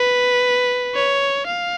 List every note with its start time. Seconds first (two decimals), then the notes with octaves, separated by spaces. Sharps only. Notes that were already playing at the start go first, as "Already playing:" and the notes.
Already playing: B4
0.95 C#5
1.47 F5